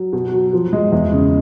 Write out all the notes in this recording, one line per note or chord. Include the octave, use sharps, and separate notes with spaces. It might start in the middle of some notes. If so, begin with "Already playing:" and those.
Already playing: F#3
B2
F#3
F3
G#3
E2
C#3